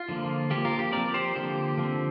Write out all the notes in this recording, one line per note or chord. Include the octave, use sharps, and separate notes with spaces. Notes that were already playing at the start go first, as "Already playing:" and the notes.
Already playing: F4
D3 F3 A#3
F3 A#3 G4
F4 A#4
G4
F3 C4 A#4 D5
G4 C5
D3 F3 A#3 G4
D3 F3 C4